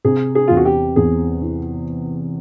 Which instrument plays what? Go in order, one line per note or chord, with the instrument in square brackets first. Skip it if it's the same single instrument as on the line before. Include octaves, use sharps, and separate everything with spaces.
[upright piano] C3 [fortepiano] G#4
[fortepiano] G#4
[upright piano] E2 [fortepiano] F4
[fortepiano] F#4
G4
[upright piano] E2 [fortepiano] G#4
[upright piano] E3